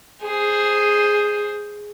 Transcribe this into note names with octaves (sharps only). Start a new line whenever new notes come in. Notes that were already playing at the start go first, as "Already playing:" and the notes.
G#4 C5